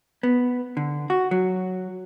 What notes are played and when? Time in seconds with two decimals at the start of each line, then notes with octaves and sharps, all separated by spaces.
0.23 B3
0.77 D3
1.10 F#4
1.31 F#3